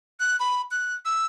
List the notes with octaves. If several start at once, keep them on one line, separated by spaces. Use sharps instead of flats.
F#6
B5
F#6
E6